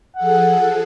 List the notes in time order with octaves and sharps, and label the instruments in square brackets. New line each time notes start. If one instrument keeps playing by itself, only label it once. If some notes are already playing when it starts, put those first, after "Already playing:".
[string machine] F3 G#4 A4 [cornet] F#5